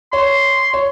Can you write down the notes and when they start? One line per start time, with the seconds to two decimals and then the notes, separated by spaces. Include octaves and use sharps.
0.12 C#5 C6
0.74 C#5